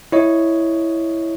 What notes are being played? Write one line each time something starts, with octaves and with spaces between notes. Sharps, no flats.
E4 C#5 D#5